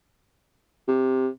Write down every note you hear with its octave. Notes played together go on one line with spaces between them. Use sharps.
C3